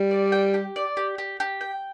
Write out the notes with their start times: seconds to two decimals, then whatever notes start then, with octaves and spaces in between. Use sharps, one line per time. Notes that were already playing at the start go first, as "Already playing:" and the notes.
Already playing: G3
0.11 D5
0.32 G5
0.54 G4
0.76 D5
0.97 G4
1.18 G4
1.40 G4
1.61 G5